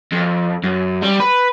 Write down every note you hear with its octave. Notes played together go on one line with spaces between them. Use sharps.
F2
F#2
G3
B4